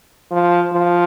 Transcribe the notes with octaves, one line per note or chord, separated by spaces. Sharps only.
F3
F3